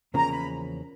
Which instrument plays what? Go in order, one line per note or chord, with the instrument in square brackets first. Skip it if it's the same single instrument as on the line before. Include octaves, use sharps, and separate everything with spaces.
[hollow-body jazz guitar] E2 C#3 F3 A#3 C#4 [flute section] A#5
[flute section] B5